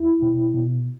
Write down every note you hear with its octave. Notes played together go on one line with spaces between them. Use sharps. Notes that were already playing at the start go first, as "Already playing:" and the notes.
Already playing: E2 E4
B2
B2